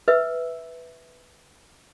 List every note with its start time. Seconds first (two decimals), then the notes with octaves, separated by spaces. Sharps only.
0.08 B4 E5 E6